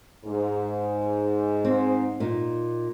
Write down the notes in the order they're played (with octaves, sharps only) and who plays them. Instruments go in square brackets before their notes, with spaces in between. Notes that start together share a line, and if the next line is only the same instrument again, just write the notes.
[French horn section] G#2
[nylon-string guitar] C4
A#2 D#4